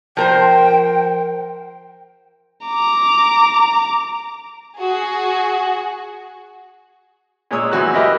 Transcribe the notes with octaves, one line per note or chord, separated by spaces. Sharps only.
F3 A#4 C5 G5
A#5 D6
F#4 G#4
A#2 G#3 C#5 D#6 E6
F#2 E3 F#4 F#6
E4 G4 A#4 B4 D#5 E5